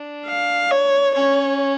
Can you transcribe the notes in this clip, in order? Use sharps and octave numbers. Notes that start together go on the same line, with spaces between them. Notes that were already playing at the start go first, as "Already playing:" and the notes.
Already playing: D4
F5
C#5
C#4 C#5